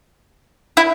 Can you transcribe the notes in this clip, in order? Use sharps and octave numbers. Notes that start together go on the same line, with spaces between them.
E4